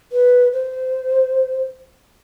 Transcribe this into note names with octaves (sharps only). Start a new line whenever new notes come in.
B4
C5